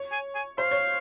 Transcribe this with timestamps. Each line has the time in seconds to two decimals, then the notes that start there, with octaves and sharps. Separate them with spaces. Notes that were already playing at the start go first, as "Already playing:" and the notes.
Already playing: C#5
0.12 G#5
0.35 G#5
0.58 C5 F5
0.71 C#5